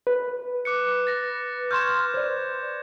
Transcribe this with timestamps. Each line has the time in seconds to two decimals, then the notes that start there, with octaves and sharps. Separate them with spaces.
0.07 B4
0.65 D6 F#6 C#7
1.07 A6 A#6
1.71 C6 C#6 F6 G6 G#6 E7
2.14 C5 D5